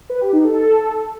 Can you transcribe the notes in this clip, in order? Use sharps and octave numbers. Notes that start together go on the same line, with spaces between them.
B4
G4
D#4
A4